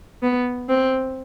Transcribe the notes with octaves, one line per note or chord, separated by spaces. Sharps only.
B3
C4